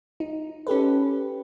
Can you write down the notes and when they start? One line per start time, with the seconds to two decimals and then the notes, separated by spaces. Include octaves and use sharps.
0.20 D#4
0.67 C#4 G4 A4 B4